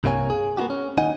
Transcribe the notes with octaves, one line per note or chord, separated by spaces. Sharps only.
C2 G2 C3 A#3 C#5 G#5
G#4
A#3 B3 D#4 F#4 G4
C#4
D#2 D#4 D#5 F#5 G#5